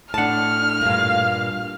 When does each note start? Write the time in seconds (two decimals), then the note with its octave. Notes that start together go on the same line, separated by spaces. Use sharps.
0.14 A2 D4 F#5 A5 F6
0.81 G2 A#2 F5